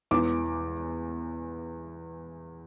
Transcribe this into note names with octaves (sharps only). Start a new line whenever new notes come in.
E2 E3 D6